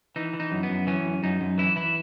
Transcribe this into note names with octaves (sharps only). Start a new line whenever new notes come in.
E3 D#4
E3
D#4
F#2
B3
F#2
E3 C#4
F#2
F#2 D#4
F#2
E3 E4
E3 E4